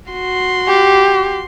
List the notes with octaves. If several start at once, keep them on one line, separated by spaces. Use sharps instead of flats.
F#4 C6
G4